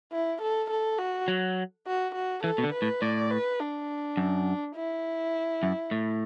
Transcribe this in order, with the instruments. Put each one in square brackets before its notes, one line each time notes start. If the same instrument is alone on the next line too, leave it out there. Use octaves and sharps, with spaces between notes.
[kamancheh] E4
A4
A4
F#4
[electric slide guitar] F#3
[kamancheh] F#4
F#4
[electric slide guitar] E3 [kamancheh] A4
[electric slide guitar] B2
D3
[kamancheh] B4
[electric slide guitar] A2
[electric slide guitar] A2 [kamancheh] D5
[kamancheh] B4
D4
[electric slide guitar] F#2
[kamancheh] E4
[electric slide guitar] F#2
A2